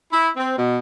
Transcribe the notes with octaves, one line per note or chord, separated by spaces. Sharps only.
E4
C4
B2